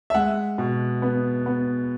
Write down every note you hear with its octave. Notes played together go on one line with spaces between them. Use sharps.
E5
G#3 F#5
B2
B3
B3